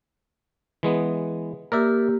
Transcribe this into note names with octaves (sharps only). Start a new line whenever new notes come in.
E3 G#3 B3
A#3 G4 A#4 D5 E5